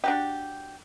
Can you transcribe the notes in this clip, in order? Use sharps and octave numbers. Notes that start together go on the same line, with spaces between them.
D4 F#4 G4